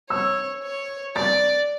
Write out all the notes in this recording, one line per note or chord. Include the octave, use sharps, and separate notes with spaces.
C#5 E6
C#5
D5 A6